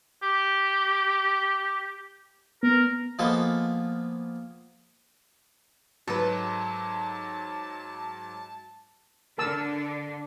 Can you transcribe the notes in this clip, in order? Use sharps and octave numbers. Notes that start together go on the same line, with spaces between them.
G4
B3 A#4
F3 G#3 A#3 B3 A4
G#2 F#3 A4 B4 A5
D3 D4 A#4 A5 E6